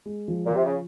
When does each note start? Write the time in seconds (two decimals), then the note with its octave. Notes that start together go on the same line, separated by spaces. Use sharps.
0.06 G#3
0.28 F3
0.46 A#2
0.51 C3 F3
0.65 C#3